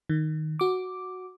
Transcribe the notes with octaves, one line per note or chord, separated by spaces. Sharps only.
D#3
F#4 D6